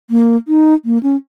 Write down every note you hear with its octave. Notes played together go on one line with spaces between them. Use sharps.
A#3
D#4
A#3
C#4